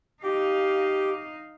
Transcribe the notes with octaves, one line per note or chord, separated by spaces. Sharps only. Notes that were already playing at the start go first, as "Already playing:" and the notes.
D#4 G4 F5